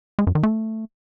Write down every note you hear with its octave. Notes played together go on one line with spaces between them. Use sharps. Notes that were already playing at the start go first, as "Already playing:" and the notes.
G#3
F#2
D#3
A3